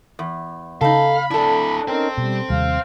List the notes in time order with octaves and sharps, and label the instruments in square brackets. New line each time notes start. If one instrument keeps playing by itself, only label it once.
[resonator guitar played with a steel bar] E2
[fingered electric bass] C#3 [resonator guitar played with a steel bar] D#4 A4 [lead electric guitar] F5 [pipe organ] B5
[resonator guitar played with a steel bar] D4 A4 [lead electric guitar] E4 D5
[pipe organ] C#4 D#4 A#4 [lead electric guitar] C5 G5
[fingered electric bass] B2 [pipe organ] G3
[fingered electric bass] D#2 C3 G3 [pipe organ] F5